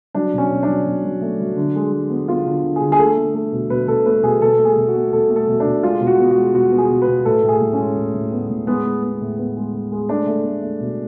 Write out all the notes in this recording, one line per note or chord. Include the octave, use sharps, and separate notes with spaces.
F#3 D4
B2 C#4
B2
D4
F#3
B2
F#3
A3
F#3
D3
G#3
G#3
B3
B3 F4
D3
D3
G#4
D3
G#4
A3 A4
A3
A3 A4
B2
B2 B4
B2 A4
A3 B4
B2 G#4
B2 A4
A3
G#4
B2
F#4
A3
B2 A4
A3
A4
B2
D4
B2
G#3 F4
B2
F#4
B3
F#4
G#3
B2 F#4
B3
G#4
B2
B4
B2
A2 A4
A2
G#4
A2
C#4
G#3
A2
A2
B3
A2
G#3 B3
G#3
B3
A2
B3
G#3
G#3
G#3
A3 D4
A3
A3
A3
B2